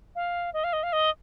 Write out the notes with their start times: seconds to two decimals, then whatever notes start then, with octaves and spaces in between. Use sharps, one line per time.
0.15 F5
0.53 D#5
0.64 F5
0.73 D#5
0.83 F5
0.93 D#5